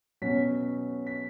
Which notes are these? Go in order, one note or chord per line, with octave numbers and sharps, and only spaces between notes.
B2 F#3 C#4 B6
B6